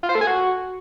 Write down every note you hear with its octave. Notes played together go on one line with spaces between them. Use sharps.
F4
C5
A3
G#4
F#4